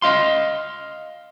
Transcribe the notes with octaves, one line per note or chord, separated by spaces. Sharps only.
D#5 F5 C6